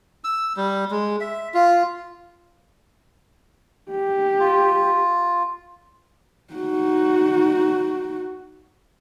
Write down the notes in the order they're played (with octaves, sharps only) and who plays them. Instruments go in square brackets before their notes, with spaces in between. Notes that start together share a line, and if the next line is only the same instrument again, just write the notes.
[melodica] E6
G3
G#3
E5
F4
[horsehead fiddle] G4
[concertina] F4
[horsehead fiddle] D#4 F#4